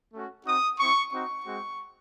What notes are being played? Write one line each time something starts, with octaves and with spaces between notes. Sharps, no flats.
A3 C#4 F#4
C4 D#4 F#4 D#6
C4 E4 C#6
C4 D#4 F#4 C#6
G#3 C4 F#4